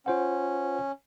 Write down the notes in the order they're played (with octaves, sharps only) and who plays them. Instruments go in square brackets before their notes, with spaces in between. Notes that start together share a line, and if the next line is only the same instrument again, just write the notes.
[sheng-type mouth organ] C#4 [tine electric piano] F4 C5 F#5